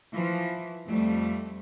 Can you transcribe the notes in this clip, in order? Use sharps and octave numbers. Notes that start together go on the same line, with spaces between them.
E3 F3
F2 G3 A3